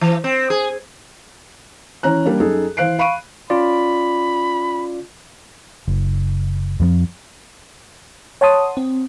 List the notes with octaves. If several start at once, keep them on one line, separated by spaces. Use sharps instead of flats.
E3
C4
G#4
E3 C#4 A#5 F#6
G3 A#3 D4
F#2 D#4 G#4 A4
E3 C5 F5 F#6 C7 D7
F5 B5 C#6 D7 D#7
C#4 F4 D5 B5
F#1
F2 F3 C4
C#5 F#5 A5 C6 D#6
C4